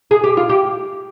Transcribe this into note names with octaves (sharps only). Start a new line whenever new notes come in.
G#4
G4
F4
G4